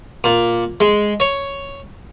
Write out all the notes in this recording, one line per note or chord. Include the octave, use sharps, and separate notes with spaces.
A#2
G#3
C#5